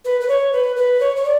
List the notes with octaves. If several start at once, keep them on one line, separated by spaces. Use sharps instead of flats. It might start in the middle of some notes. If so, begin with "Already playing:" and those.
B4
B4
C#5
B4
B4
C#5
C#5
D5